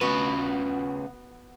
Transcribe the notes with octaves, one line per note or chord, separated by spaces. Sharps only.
C#3 B3 F#4 B4